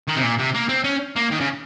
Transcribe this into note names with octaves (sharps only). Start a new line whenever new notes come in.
D#3
C3
A#2
C3
A#3
C4
C#4
A#3
D#3
C#3